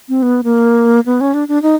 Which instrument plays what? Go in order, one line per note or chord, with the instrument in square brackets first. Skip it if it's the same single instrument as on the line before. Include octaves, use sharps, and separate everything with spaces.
[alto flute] C4
B3
A#3
B3
C#4
D4
D4
D#4